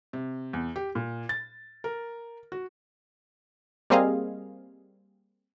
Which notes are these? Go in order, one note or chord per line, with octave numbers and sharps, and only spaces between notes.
C3
E2
G4
A#2
A6
A#4
F#4
G3 A#3 C4 G#4 D#5 F5